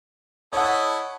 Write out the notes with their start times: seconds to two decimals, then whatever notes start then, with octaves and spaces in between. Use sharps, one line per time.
0.53 E4 A4 C#5 D#5 F#5